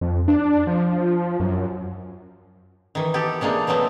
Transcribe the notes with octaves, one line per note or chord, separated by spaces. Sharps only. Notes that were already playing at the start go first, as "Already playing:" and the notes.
F2
D4
F3
F#2
D#3 E3
B3 G4 A4
C3 G#3 A#3 D4
E3 F#3 A3 B3 C4